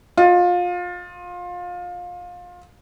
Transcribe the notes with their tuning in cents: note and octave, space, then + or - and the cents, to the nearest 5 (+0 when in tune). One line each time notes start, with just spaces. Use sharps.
F4 +25 D#5 +0